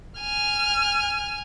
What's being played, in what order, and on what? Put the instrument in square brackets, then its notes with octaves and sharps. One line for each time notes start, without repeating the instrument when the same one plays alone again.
[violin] G#5 F6